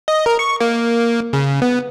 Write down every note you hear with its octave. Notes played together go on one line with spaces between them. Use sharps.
D#5
A#4
C#6
A#3
C#3
B3